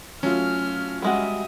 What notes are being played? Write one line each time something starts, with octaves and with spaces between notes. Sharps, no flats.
F#3 A3 C#4 F4 F6
G3 G#3 F#4 E5 D#6